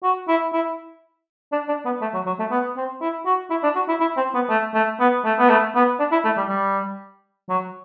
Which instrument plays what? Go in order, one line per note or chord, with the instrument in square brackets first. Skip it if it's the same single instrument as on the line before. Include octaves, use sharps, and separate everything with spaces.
[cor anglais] F#4
E4
E4
D4
D4
B3
A3
F#3
F#3
A3
B3
C4
E4
F#4
E4
D4
F#4
E4
E4
C4
B3
A3
A3
B3
A3
B3
A3
B3
D4
E4
A3
G3
G3
F#3